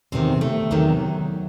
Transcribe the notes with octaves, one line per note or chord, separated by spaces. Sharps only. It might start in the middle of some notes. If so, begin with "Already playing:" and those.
E2 C3 D#3 C4
A3
E2 C3 D#3 F#3